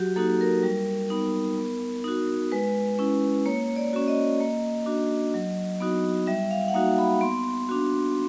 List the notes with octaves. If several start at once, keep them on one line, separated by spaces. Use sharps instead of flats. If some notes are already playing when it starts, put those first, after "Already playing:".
Already playing: F#3 F#4 G4
A#3 D#4 F#4 A4
A#4
G3
B3 D#4
B3
D#4 F#4
G#3 B4
C#4 E4
A#3 C#5
D5
C#4 F#4
D#5
A#3
D4 F#4
F#3
B3 D#4 F#4
G3 E5
F5
F#5
A#3 D#4 F#4 F5
B5
B3 C6
D4 F#4